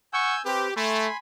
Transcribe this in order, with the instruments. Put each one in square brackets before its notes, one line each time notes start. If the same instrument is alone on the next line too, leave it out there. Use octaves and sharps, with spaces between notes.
[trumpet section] F#5 C#6 [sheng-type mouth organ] G#5 E6 G6
[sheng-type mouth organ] C4 B4 [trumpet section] G4
[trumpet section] A3 [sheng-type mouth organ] G#5 B5 C6